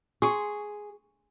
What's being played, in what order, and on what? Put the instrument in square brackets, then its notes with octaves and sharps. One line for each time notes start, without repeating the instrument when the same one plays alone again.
[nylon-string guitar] G#4 [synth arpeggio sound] C6 C#6